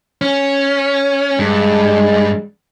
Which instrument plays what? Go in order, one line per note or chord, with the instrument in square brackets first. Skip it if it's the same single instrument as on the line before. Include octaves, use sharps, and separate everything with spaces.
[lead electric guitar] C#4
[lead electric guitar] G2 [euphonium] G#3